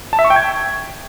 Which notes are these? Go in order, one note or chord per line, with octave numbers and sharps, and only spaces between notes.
A5
E5
C#6
G5
G#6